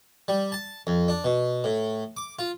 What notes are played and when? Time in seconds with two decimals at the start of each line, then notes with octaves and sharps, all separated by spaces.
0.28 G3
0.52 A5
0.87 F2
1.08 D4
1.24 B2
1.64 A2
2.17 D6
2.39 F4